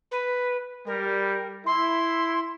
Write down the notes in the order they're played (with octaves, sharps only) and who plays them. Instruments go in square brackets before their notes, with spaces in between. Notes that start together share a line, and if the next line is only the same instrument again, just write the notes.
[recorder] B4
[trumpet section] G3 [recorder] A#4
[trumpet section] E4 [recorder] C6